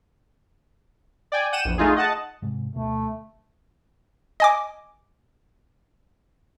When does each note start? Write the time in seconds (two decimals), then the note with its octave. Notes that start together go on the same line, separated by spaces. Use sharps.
1.32 D5 G5 G#5
1.53 F#5 G5 D#7 E7
1.65 A#1 E2
1.78 A3 D#4 F4 G#4
1.96 D#5 F#5 A5
2.42 G#2 C3 G#3
2.76 D2 B2 A3
4.40 D#5 G#5 D6